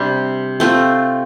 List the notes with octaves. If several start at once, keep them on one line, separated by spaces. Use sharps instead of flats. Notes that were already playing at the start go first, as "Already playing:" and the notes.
Already playing: C3 G3 D4 G4
A3 C4 F4